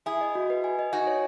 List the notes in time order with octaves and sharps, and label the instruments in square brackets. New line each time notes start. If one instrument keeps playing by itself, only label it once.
[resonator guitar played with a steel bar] E4 G#4 [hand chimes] G#5
[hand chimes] D#5
F#4
B4
G#5
D#5
[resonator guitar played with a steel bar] D#4 F#4 [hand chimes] G#5
[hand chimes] C#5